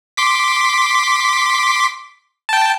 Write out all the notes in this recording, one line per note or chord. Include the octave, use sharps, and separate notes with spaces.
C6 D6 B6
G5 A5